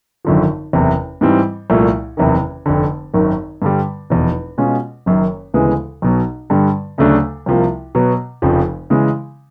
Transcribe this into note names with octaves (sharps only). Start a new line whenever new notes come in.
G#1 F#2 D3 F3
F#1 E2 C3
G#2 E3 G3 C4
C2 A#2 F3 A3
F#1 E2 C3 D#3
F1 F2 D3
G#1 F#2 D#3
G2 D3 G3
F1 E2 B2
B2 G#3 C#4 F4
F#1 F#2 D#3
D2 C#3 E3 G#3 B3
B1 B2 F#3
G2 D3 G3
D2 C#3 F#3 A3 D4
C2 C3 F3 A#3
B2 F#3 B3
F1 F2 C#3 F3
C#3 E3 G#3